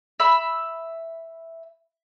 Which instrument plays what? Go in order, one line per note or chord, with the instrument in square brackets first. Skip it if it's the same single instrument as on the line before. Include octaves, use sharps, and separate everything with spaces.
[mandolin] E5 B5